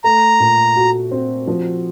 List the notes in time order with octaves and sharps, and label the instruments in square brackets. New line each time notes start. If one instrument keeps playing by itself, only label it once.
[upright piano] A3 [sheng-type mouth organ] A#5
[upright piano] A#2
F#4
C4
F3